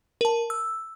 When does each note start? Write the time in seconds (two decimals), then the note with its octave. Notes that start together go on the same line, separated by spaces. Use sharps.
0.21 A#4 A5
0.50 E6